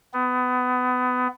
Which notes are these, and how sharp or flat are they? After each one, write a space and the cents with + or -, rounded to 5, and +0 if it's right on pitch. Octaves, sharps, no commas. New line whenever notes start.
B3 +25